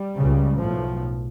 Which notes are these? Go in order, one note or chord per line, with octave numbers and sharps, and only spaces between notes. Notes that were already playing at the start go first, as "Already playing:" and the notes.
Already playing: G3
C#2 C#3
B1 A2 F3